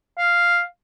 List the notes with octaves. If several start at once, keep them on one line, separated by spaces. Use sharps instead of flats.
F5